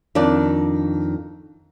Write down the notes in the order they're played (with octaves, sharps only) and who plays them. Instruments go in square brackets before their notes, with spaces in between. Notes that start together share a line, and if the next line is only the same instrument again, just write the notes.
[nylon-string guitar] F2 D#3 D4 D5